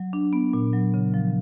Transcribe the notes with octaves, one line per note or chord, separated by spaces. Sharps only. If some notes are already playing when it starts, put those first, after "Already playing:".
Already playing: F#3
D4
B3
A#2
F#3
C#3
F3